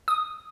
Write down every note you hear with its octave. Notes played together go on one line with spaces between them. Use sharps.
D#6